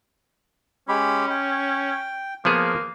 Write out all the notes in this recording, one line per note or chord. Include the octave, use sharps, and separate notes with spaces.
G#3 C#4 G4 B5
G5
F3 A#3 B3 G#4